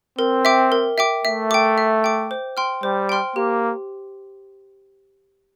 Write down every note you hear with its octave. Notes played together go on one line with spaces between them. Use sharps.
C4 A#4
E5 G5 D6
A#4
E5 G5 D6
A3 E5
G5 D6
E5
G5 D6
C5
G5 C6 F6
G3 C5
G5 C6 F6
A#3 G4